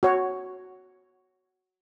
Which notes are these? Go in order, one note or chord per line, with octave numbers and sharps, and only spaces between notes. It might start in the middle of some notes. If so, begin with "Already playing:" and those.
F#4 C#5